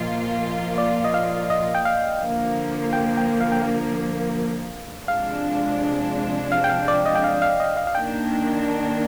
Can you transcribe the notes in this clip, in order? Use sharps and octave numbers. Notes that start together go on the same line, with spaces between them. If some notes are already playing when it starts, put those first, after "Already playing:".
Already playing: A#2 F3 A#3 F4 D#5
D5
D#5
F5
D#5
G5
F5
D3 F3 A#3
G5
G5
F5
G5
F5
C3 F3 G#3 D4 F5
F5
G5
F5
D5
D#5
G5
F5
F5
D#5
F5
F5
D#3 A#3 D4 G5